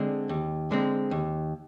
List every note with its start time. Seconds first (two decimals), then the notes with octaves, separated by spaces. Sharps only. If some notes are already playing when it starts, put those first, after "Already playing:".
Already playing: D3 G#3 C4
0.29 D#2
0.71 D3 G#3 C4
1.11 D#2